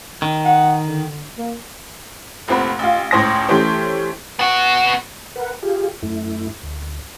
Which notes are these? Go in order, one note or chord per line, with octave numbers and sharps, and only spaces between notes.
D#3
F#5
D3
A#3
F1 A#2 C4 F#5 B5
A1 F4
C#2 A2 C5 G#5 D#6 A#6
E3 A3 C#4 G4 C5
B3 F#4
A#4 B4 F#5
F4 G4 G#4
F#2 A3 E4
D2